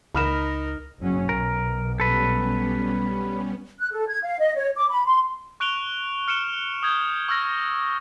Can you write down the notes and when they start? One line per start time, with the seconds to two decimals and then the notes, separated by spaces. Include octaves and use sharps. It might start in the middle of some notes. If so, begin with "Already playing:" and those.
0.15 C#2 D#4 A#4 B5 F6 E7
1.00 F#1 F#3 C#4
1.29 B1 A#4
2.00 G3 B3 C#4 A4 B4
3.78 F#6
3.91 A4
4.08 G#6
4.23 F5
4.39 D#5
4.56 C#5
4.76 D6
4.90 B5
5.05 C6
5.60 C#6 F#6 D7 F7 G7
6.28 F6 C#7 D7 E7 G7
6.83 D#6 G6 G#6
7.28 C#6 E6 F6 G#6 A#6